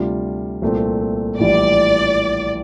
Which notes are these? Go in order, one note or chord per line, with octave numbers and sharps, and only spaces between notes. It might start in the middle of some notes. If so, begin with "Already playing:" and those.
Already playing: D2 C3 G3 D4 F4
C2 A#2 A3 C4
A#1 A2 E3 G3 D5